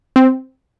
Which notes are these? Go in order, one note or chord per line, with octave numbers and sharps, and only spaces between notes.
C4